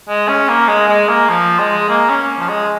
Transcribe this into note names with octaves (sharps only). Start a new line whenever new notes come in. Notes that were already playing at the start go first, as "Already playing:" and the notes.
G#3
C#4
A#3
G#3
G#3
A#3
F3
G#3
A#3
C#4
F3
G#3